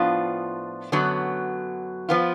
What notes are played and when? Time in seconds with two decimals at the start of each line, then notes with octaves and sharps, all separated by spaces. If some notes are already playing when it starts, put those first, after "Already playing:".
Already playing: A2 F3 B3 D4 F4
0.92 F#2 D3 F#3 B3
2.09 F3 B3 F4